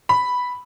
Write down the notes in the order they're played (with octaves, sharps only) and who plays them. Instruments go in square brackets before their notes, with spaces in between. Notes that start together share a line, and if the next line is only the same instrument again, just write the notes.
[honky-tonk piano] B5